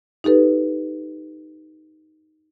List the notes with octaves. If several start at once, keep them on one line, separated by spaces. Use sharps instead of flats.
D#4 G4 A4 B4